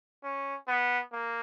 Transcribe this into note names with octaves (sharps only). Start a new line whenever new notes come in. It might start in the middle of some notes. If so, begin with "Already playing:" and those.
C#4
B3
A#3